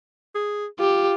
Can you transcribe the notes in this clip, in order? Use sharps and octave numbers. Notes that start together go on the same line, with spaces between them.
G#4
F4 G4